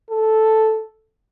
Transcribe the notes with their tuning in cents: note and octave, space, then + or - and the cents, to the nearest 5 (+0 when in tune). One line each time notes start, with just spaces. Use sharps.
A4 -5